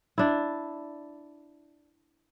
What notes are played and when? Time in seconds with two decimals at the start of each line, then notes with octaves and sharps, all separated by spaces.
0.18 D4 E4